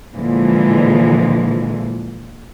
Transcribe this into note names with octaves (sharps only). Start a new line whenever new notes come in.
A#2 D3 E3 F3 G#3